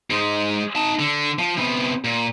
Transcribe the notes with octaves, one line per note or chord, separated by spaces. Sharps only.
G#2 G#3
D#4 A5
D3
F3
C3 B3
A#2